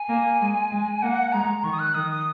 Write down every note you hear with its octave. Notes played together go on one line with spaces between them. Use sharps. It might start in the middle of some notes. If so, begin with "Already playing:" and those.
Already playing: G#5
A#3
G#3
G#3
A#3 F#5
G#3 A#5
D#3 C#6
D#6
F#6
D#3 D#6
D#6